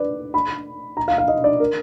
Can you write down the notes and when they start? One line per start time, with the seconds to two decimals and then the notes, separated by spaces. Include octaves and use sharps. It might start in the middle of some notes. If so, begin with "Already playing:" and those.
Already playing: B4 D5
0.34 B5
0.97 A#5
1.08 F5
1.18 F5
1.28 D#5
1.44 D5
1.60 A#4